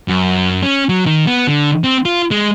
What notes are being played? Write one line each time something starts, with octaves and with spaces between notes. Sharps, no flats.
F#2
C#4
F#3
D#3
B3
D3
C4
F4
G#3